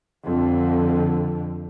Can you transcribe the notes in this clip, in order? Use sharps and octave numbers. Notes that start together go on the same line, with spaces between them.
F2 D3